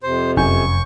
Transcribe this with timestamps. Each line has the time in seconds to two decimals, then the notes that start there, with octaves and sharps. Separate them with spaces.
0.03 F2 C3 C5
0.37 F1 F#2 G#5 C#6 G6